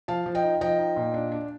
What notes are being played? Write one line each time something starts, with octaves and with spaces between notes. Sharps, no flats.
F3 F5 A5
F3
D#5 G5
D#4
F3 D#5 G5
D#4
A#2
D4
D4